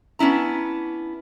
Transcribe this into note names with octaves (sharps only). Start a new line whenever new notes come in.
B3 C#4 D4 E4 A#5